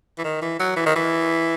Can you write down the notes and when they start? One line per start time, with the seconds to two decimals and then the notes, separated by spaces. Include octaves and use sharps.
0.18 E3
0.24 D#3
0.42 E3
0.60 F#3
0.77 E3
0.86 D#3
0.96 E3